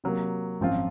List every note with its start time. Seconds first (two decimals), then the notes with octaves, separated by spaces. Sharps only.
0.04 C3 F#3 A#3
0.60 G#1 F#2 F3 C4 F4